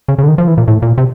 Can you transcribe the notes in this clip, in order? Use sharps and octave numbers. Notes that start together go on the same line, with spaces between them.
C#3
C#3
D3
D#3
F3
E3
A#2
A2
A#2
C3